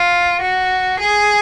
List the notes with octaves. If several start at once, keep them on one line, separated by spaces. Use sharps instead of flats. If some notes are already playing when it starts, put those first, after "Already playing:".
Already playing: F4
F#4
G#4